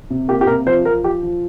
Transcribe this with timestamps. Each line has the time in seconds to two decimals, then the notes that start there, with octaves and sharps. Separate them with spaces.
0.10 C3
0.28 A#3 G4
0.41 G4
0.47 C3 A#4
0.66 F3 C5
0.85 F3 A#4
1.04 F3 G4
1.23 F3